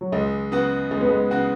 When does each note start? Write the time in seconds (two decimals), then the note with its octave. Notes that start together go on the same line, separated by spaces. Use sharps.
0.01 F#3
0.12 C#2 G#3
0.52 C#3 B3 F#4
0.91 C#2 G#3
1.01 B3
1.09 G#3
1.31 C#3 B3 F#4